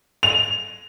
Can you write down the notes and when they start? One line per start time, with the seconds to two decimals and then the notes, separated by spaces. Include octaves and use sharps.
0.23 F7